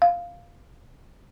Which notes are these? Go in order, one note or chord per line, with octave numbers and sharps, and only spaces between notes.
F5